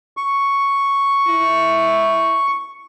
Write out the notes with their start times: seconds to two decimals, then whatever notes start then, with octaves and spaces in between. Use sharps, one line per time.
0.17 C#6
1.29 E4